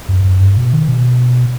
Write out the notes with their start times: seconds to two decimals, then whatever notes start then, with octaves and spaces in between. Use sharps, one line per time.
0.09 F#2
0.25 F#2
0.40 G2
0.57 B2
0.73 D#3
0.88 B2